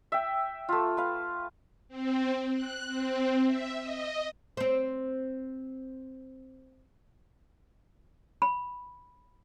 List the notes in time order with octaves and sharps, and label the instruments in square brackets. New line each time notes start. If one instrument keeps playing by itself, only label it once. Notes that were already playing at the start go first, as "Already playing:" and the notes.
[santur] E5 G5
A3 F4
B4 F5
[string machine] C4
F#6
C4
E5
D#5
[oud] C4 C5
[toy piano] B5